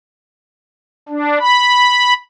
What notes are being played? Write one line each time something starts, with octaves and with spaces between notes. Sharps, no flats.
D4
B5